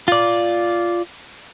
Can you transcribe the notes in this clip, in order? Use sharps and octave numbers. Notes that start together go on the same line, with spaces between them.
F4 D5